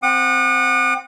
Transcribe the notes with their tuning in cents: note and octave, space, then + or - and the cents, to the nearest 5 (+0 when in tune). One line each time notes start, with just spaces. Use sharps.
C4 +0 F#5 -20 D#6 -45